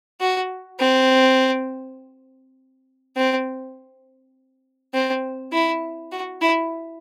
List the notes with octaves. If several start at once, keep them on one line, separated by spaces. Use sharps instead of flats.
F#4
C4
C4
C4
E4
F#4
E4